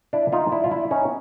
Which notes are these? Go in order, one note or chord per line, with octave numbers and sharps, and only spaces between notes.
D4 E4
D#4 F4
D4 E4
F4
D4 E4
C#4 D#4